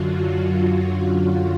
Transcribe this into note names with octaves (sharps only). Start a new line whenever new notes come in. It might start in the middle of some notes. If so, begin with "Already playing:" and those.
Already playing: F#2 D3 F#3 F4 F#4